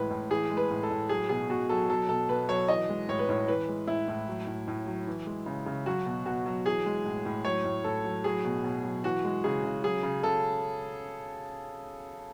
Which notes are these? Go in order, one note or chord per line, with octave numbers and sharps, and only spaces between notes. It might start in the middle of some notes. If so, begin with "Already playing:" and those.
Already playing: A2 E3 G#3 B4
A2
E3 G#4
G#3
B4
A2
A4
A2
F#3 G#4
B2 G#4
B2 F#4
F#3 A4
F#3 A4
B2 A4
B2 B4
F#3 C#5
E3 D#5
G#3
A2 C#5
B4
A2 C#5
E3 B4
G#3
A2 E4
A2
F#3
A2
A2
F#3
E3
G#3
C#3
C#3
F#3 F#4
B2
B2 F#4
F#3
E3 G#4
G#3
A2
A2
F#3 C#5
A2
A2 A4
F#3
F#3 G#4
B2
B2
F#3
E3 F#4
G#3
C#3 G#4
C#3
F#3 G#4
C#3
C#3 A4